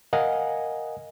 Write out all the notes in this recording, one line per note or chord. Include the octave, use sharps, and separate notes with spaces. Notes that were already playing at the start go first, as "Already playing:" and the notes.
A#4 D#5 F5 F#5 G#5